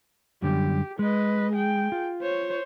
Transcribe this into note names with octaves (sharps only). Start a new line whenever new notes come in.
F#2 D3 G3 G4
G#3 B4 D#5
G#4 G5
F4
C5 C#5